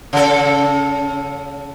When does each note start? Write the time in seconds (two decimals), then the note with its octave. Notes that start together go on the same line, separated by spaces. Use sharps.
0.13 C#3 A4